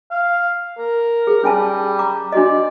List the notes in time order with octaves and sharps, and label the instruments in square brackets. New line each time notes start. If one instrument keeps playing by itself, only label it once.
[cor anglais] F5
A#4
[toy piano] G#4
[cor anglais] G3 [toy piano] C#4 G#5 A5
[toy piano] A#5 D6
[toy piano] D4 F#4 D#5 [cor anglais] D5